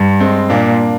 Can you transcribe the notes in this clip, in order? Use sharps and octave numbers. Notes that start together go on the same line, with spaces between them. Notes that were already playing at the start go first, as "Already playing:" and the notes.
Already playing: G2
G#3 C4
A#2 A#3 D4